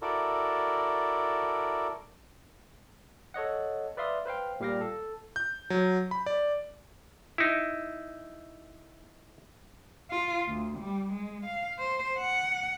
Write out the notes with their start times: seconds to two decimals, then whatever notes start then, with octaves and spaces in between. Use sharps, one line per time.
0.02 E4 F#4 A4 A#4 D5
3.34 A4 C#5 D#5 F#5
3.97 B4 D5 E5 F5 C6 D#6
4.26 B4 C5 F5 G5
4.60 A#2 G3 G4 F5 G5 A#6
4.81 A4
5.36 G6
5.70 F#3
6.11 B5
6.26 D5
7.38 D#4 E4
10.10 F4
10.48 D2
10.79 G3
11.13 G#3
11.46 F5
11.79 C5
12.19 F#5